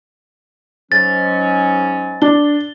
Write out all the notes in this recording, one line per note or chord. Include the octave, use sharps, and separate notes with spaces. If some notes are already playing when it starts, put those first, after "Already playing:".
G#2 F#3 C#4 A6
D4 G7